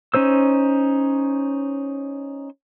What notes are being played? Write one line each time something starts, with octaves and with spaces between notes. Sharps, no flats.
C#4 D#4 C5 E6